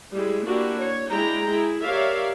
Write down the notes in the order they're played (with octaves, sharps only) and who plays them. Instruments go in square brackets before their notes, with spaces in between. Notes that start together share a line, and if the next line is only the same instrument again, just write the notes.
[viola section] G3 G#3 E4
A#3 D4 E4 F#4 G4
C#5
G#3 D4 E4 G5 A#5
E4 G#4
G4 A#4 C#5 D5 E5 F5